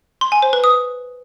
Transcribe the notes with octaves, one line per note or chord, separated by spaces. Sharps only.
C6
G#5
C5
B4
D#6